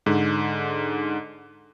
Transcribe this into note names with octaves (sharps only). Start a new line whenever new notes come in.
G#2 D3